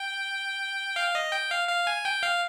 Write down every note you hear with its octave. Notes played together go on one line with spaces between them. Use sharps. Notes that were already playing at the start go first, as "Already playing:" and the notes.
Already playing: G5
F5
D#5
G5
F5
F5
G#5
G5
F5